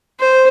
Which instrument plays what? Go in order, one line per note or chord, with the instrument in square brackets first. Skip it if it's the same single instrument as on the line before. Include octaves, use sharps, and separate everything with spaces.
[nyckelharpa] C5